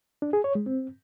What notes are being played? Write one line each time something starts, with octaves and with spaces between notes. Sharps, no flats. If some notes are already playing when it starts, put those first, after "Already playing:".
D4
G#4
C#5
G#3
C4